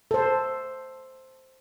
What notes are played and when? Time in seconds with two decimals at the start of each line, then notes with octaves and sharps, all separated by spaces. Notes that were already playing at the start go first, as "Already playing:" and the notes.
0.11 A4 C5